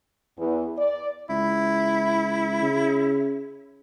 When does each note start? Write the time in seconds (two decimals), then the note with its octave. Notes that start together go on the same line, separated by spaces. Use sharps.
0.38 E2
0.78 D5
1.29 C#2 E4
2.62 C#3